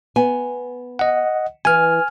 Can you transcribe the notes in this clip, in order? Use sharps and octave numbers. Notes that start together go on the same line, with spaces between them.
B3 G#5
D#5 F#5
E3 B4 G#5 F6